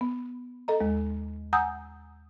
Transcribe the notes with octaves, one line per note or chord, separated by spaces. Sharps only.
B3
A4 D#5 A#5
D#2 G#3
F#5 G#5 A#5 D#6 E6 G6